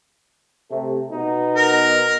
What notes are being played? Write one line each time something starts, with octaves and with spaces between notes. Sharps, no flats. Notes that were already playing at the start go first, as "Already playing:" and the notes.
C3 A3
B2 B3 D#4
A#4